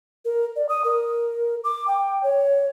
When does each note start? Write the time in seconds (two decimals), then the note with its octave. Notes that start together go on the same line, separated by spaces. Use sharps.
0.25 A#4
0.56 D5
0.69 D#6
0.85 A#4
1.64 D6
1.88 G5
2.23 C#5